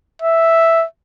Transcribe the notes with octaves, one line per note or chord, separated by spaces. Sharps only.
E5